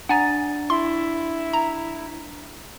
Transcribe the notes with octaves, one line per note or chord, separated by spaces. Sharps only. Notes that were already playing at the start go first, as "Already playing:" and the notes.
D4 F#5 G#5 A#5 A6
E4 C6
A#5